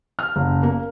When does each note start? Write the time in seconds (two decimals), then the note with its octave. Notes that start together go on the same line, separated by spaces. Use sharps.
0.19 F6
0.36 F#1
0.63 A#3